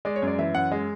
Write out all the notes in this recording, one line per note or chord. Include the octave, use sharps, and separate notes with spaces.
G#3 D5
C#5
F#2
D5
E3 E5
F#2 F#5
G#3